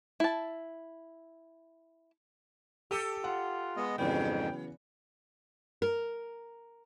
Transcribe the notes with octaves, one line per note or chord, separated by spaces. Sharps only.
E4 A5
G4 A4 E6 D#7
F4 F#5
G#3 B3 D#5
F2 G#2 C#3 E3 F#3 B3 G5
A#4